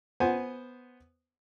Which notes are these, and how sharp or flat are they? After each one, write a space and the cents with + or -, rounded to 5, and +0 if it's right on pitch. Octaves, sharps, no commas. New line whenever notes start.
B3 +0 C5 +0 G#5 +0